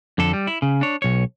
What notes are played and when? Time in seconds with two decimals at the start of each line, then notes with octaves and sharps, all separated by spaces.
0.18 F2 D3 A4
0.33 G3
0.47 E4
0.62 C#3
0.81 D4 C#5
1.02 B1 C#5